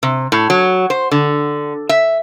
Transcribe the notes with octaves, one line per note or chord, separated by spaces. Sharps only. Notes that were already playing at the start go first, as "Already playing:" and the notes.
C3
A2
F#3
C5
D3
E5